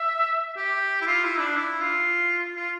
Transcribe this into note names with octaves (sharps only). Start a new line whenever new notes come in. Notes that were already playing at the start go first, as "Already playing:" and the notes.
Already playing: E5
G4
E4
F4
E4
D4
E4
F4
F4